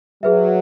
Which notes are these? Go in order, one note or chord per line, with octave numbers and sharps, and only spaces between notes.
F#3 G#4 B4 E5